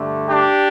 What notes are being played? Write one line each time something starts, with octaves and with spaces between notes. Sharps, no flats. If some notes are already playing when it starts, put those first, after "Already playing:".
Already playing: G2 D3 A3
D4 G4